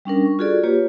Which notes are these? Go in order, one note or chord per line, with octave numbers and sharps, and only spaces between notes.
G3 C#4 D4 A#4
C#6
F4 F#4 G#4 A4 D5
A#3 F4 G4 B4 C#5